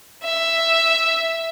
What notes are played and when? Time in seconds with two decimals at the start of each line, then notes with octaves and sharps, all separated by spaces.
0.24 E5